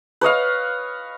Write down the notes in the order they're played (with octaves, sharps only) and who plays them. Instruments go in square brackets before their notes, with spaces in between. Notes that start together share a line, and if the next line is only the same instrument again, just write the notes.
[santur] B4 C#5 D#5 F5